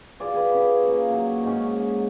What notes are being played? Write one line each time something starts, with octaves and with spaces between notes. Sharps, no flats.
F4 F#4 G#4 D5
G#4 B4
C#4 B5
A#3
A#2 F#3
G#2 G#3 C#4